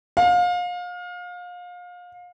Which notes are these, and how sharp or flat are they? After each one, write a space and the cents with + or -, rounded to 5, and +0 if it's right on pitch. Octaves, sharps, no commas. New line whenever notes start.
F5 +30